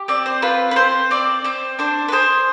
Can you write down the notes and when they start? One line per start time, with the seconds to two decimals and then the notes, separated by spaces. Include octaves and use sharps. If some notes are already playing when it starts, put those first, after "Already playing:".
Already playing: G4
0.08 C4 D5
0.26 C5
0.42 F4 B4
0.71 B4
0.76 C4 C5
1.11 C4 D5
1.44 C4 C5
1.79 D4 C5
2.08 B4
2.12 G#4 C5